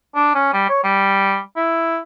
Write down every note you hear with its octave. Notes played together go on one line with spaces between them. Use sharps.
D4
C#4
G3
C#5
G3
E4